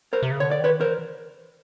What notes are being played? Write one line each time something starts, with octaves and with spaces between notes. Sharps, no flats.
A#4 C5
C3
C#3
D3 C#5
D5
D#3 B4 C#5
E3 A#4 C5